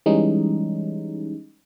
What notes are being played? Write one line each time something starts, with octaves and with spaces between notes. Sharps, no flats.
E3 G3 G#3 C#4 D#4